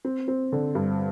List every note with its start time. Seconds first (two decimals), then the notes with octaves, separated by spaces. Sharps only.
0.05 C4
0.28 C4
0.52 D3
0.75 G2